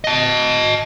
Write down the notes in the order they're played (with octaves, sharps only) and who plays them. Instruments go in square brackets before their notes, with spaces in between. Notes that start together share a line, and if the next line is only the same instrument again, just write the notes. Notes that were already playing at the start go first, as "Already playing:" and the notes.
[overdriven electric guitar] D#5 A5